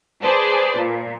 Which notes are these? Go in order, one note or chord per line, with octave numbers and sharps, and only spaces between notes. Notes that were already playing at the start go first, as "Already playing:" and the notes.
G#4 B4 C5 D5 A5
A#2